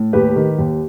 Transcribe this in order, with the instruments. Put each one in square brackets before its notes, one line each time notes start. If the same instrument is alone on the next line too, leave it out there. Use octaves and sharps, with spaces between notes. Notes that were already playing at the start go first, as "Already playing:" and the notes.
Already playing: [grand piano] A2
D#2 G4 B4
D#3
D#2